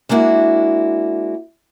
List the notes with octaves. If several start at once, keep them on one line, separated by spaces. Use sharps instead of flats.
G#3 A#3 D4 E4 F#4